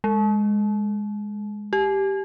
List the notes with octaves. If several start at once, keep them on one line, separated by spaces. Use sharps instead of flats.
G#3
G4